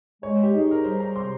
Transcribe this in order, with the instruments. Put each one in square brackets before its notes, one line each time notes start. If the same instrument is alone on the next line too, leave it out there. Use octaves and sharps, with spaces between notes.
[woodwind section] G#3 [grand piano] C#5
[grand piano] G4
[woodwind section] D#4 [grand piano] G#4
[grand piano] A#4
[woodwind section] G3 [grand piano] C5
[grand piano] A#5
[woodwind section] C3 [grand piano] C6